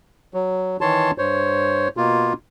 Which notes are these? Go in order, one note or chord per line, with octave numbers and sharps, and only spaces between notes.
F#3
D#3 E3 C#5 A5 C6
G2 C5 C#5
B2 A#3 F4